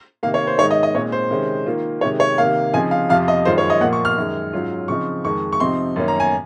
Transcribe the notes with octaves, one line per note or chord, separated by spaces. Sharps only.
C3 D#3 A#3 F5
C#5
C5
G#2 D#3 G#3 D#4 C#5
D#5
D#5
A#2 G#3 C4 D#4 C#5
C5
C3 D#3 G#3 C#4
D#3 A#3 F4
C3 D#3 G#3 C#5
C#5
C3 D#3 A#3 F5
C#3 F3 C4 D#4 G#5
F5
F2 C3 F3 F5
D#5
F#2 D#3 G#3 C#4 F4 C5
C#5
D#5
A#2 F3 A#3 F#5
C#6
F6
F#2 D#3 G#3
G#2 F#3 C#4 F4
C#3 F3 C4 D#4 C#6
F2 D#3 G#3 C#6
C#6
C3 F3 C4 D#4 C6
F#2 D#3 A#3 C#4
A#5
G#5